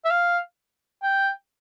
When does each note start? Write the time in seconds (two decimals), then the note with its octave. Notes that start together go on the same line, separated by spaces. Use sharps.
0.05 E5
0.11 F5
1.02 G5